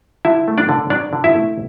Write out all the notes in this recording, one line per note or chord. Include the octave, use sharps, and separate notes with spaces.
D3 E4 E5
A3
D4 D5
D3
F#3 D4 D5
D3
E4 E5
A3